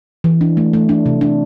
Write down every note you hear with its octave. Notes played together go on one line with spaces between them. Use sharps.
E3
D4
A3
A3
D4
C3
D4